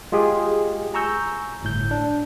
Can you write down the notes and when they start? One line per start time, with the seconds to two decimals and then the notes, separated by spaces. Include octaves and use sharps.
0.12 G#3 F4 G4 G#4
0.94 G#5 A#5 C#6 E6 G6
1.63 G1 A2 G6
1.91 D4